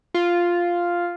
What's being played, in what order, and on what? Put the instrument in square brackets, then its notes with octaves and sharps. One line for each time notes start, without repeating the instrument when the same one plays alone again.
[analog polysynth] F4